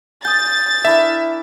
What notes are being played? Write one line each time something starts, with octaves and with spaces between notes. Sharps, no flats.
G#5 D#6 G6 A6
D4 E4 A#4 E5